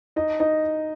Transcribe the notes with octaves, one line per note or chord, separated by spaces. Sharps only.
D#4 D#5
D#4 D#5